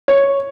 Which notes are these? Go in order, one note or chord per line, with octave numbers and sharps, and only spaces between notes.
C#5